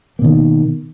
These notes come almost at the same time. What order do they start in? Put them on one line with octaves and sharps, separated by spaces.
A#3 B2 D#3